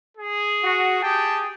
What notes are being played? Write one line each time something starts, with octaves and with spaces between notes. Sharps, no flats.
G#4
F#4
G4 G#4 G5 A5